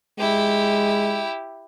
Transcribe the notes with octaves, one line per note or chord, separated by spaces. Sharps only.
G#3 E4 G4